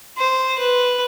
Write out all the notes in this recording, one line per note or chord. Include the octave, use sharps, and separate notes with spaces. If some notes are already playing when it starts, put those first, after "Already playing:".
C5
B4